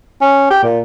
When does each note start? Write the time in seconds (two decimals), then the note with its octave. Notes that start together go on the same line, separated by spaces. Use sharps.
0.21 C#4
0.50 G4
0.63 A#2